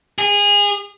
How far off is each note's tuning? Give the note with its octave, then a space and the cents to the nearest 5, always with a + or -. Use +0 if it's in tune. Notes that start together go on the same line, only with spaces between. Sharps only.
G#4 -25